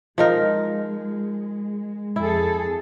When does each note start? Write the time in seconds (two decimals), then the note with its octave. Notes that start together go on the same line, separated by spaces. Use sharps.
0.18 F3 G#3 D#4 A#4
2.16 F2 E4 G#4 A4